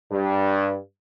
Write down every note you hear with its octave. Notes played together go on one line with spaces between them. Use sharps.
G2